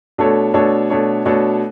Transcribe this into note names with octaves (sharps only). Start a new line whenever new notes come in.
B2 A3 D4 A4 C#5
B2 A3 D4 A4 C#5
B2 A3 D4 A4 C#5
B2 A3 D4 A4 C#5